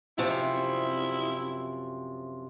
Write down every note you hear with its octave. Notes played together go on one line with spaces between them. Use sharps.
F#2 C3 F3 E4